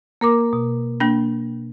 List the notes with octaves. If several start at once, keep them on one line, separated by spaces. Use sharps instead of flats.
A#3 A#4 D6
B2
A#3 D4